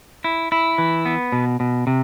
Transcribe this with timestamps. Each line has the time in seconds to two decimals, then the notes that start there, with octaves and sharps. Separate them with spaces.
0.24 E4
0.52 E4
0.78 E3
1.06 B3
1.32 B2
1.60 B2
1.87 C3